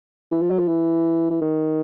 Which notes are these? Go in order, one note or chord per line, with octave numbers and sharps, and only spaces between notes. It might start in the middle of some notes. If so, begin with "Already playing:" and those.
E3
F3
F#3
F3
E3
E3
D#3